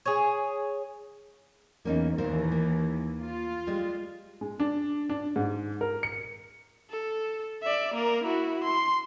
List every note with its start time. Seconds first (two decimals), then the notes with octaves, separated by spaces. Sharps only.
0.06 G#4 C#5
1.85 E2 A#3 C#4 D#4
2.18 D#2 A#2 E3 A#4 C5
2.52 A#3
3.20 F4
3.67 G3 G#3
4.41 G#3
4.60 D4
5.09 D4
5.36 G#2
5.81 A#4
6.03 C#7
6.90 A4
7.62 D5 E5
7.95 A#3 A#4
8.24 E4 F#4
8.64 C6